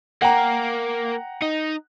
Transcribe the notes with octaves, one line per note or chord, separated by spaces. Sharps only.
A#3 F#5 G5 A#5
D#4